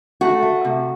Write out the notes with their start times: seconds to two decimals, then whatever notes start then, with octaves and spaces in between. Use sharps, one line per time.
0.21 A3 F#4
0.43 A3
0.65 C3